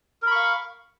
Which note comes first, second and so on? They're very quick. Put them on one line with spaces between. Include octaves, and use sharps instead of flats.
A#4 B5 C#6 F5